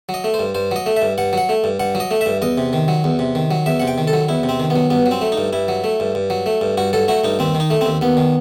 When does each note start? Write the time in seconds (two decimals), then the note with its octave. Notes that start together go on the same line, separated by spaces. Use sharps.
0.09 F#3
0.14 D#5
0.24 A3
0.34 C5
0.39 G2
0.55 G2 C5
0.71 F#3 D#5
0.86 A3
0.96 E5
1.02 G2
1.18 G2 F#5
1.33 F#3 F#5
1.49 A3
1.64 G2
1.80 G2 F#5
1.95 F#3
2.00 D#5
2.11 A3
2.21 E5
2.26 G2
2.42 E2 D#5
2.58 C3
2.73 D#3
2.88 F#3
3.04 E2
3.19 C3
3.35 D#3
3.51 F#3
3.66 E2 E5
3.80 C3 F#5
3.87 G5
3.98 D#3
4.07 A4
4.13 F#3
4.29 E2 E4
4.43 C3
4.49 C4
4.60 D#3
4.70 B3
4.76 F#3
4.90 G2 B3
5.06 F#3
5.11 C4
5.21 A3
5.32 D#4
5.37 G2
5.53 G2 E4
5.68 F#3
5.84 A3
6.00 G2
6.15 G2
6.30 F#3
6.46 A3
6.61 G2
6.77 G2 F#4
6.93 F#3 A4
7.08 A3 F#4
7.24 G2 D#4
7.39 D#2 C4
7.55 D#3
7.60 D#4
7.70 A3
7.81 C4
7.86 D#2
8.01 D#2 B3
8.17 D#3